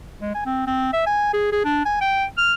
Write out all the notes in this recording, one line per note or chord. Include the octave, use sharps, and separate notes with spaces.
G#3
G#5
C4
C4
E5
G#5
G#4
G#4
D4
G#5
G5
F6